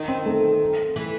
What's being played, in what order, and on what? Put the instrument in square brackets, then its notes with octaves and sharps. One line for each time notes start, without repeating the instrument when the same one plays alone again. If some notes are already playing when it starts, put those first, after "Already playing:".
Already playing: [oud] D#3 [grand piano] D#4
[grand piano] C4
A3
[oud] E3 [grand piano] A3